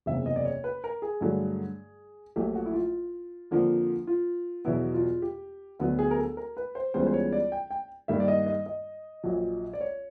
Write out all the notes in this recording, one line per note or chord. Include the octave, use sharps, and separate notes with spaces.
F#1 E2 C3 E5
D#5
D5
C#5
B4
A#4
G#4
G2 D3 F#3 A3
A#1 A#2 F#3 A3 G4
F#4
E4
F4
F2 D3 F3 A#3
F4
E2 B2 F#3 B3 E4
F4
G4
D2 D3 F#3 B3
G#4
A#4
A4
A#4
B4
C5
C#2 C#3 E3 G3 B3 C5
C5
C#5
D5
G5
G5
G2 D#3 G3 A#3 E5
D5
D#5
D#5
D#5
A#1 A#2 F#3
D5
C#5